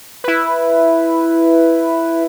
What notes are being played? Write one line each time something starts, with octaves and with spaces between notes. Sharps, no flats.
E4 B4